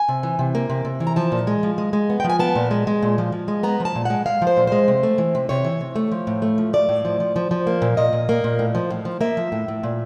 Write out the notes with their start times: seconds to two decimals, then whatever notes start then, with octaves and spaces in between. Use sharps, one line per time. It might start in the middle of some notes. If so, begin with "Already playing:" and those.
Already playing: G#5
0.08 C3
0.23 E3
0.39 C3
0.55 A#3
0.70 C3
0.85 C3
1.00 E3
1.07 A#5
1.16 F3 A5
1.32 A#2
1.47 G#3
1.63 F3
1.78 G#3
1.93 G#3
2.10 B3
2.20 G5
2.24 F3
2.30 G#5
2.39 B3 A5
2.55 A#2
2.71 G#3
2.87 G#3
3.02 A#2
3.18 F3
3.32 F3
3.48 G#3
3.63 B3 A#5
3.80 F3
3.85 A5
3.96 A#2
4.05 G#3 F#5
4.26 G#3 F5
4.42 F3
4.47 C5
4.57 A#2
4.67 G#3 C5
4.88 C3
5.03 A3
5.18 E3
5.35 C3
5.49 C3 C#5
5.65 E3
5.81 C3
5.96 A3
6.12 F3
6.27 A2
6.42 A3
6.58 F3
6.73 A3 D5
6.89 A2
7.05 F3
7.20 F3
7.36 F3
7.51 F3
7.67 A#3
7.82 A#2
7.97 A#2 D#5
8.13 A#2
8.29 A#3
8.44 A#2
8.59 A2
8.75 F3
8.90 A2
9.05 F3
9.21 A#3 E5
9.37 F3
9.52 A2
9.68 A2
9.83 A#2